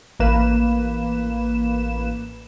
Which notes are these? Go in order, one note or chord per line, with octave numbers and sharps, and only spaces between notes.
A1 A#3 B4 E7